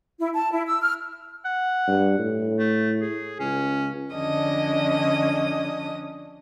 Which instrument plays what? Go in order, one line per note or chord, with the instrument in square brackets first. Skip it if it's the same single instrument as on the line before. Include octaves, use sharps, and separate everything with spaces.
[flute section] E4
A5
E4
E6
F6
[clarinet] F#5
[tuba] G2
A2
[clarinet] A3
G#4
[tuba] C#2 [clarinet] C#4
[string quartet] F2 D3 C#4 D4 D#5 D#6